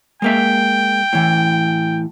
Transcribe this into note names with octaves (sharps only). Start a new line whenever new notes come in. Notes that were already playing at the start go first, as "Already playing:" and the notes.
G#3 A#3 E5 G5
A2 E3